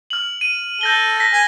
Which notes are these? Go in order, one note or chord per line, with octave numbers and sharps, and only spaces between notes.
F6 F#7
D#7
A4 G6 A#6 G7
A#6 B6
G#5